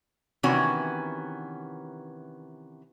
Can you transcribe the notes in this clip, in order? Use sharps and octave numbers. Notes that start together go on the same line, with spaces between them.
C3 D#3 E3 B3 C#4 F#4